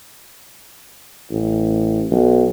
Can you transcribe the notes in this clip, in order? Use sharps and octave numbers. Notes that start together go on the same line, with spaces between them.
A1
B1